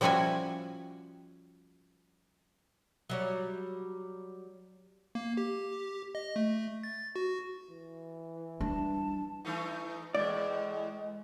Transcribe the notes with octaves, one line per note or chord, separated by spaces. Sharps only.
F3 G3 C#4 E4 F#4 G#5
F#3 G3 C#5
A#3
G4
D#5
A3
A6
F#4
E3
G3 D4 A5
E3 A3 D#4
E2 A2 G#3 D5